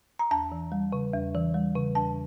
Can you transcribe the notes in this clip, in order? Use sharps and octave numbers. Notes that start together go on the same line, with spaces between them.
A#5
E2 A5
E3
G3
C#3
E2
E3
G3
C#3
E2 A5